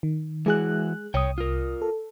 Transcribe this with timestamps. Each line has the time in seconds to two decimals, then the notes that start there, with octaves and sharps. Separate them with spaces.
0.03 D#3
0.46 E3 G#3 E4 F#4 G#4 F#6
1.14 C2 C#5 G5 D#6
1.38 F4 A#4
1.82 A4